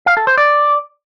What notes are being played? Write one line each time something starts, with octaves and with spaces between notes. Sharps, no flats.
F5
A4
C5
D5